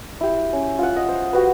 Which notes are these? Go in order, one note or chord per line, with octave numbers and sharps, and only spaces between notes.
E4 G4
C#4
F4 F#5
D#5
C5
F#4 G4 B4